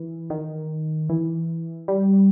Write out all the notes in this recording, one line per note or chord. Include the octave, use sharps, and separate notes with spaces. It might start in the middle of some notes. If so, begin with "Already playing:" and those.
Already playing: E3
D#3
E3
G3